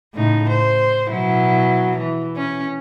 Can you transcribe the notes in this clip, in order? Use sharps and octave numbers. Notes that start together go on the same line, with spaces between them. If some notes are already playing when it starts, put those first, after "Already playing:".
A2 C#3 D#4
C5
B2 F#3 E4
E3
C#4